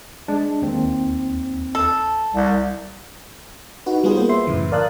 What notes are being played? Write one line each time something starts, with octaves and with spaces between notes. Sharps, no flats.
G#3 D4
D#2 C4
A4
C2
D#4 F#4 B4
G3 B3 F4 G#4
A#3 C5
B4 E5 C6
F#2 A2 C#3 E3
A#4 D5 F5 A5 D#6 F#6